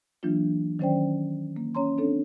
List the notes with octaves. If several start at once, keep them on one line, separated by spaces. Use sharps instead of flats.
E3 F#3 A#3 D4 F4
D#3 F#3 C#4 C5 D5 G5
A#3
C#4 C#5 A#5 C6
C4 D4 A4 C#5